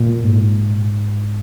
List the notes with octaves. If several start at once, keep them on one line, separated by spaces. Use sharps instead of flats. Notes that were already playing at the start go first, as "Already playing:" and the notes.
Already playing: A#2
G#2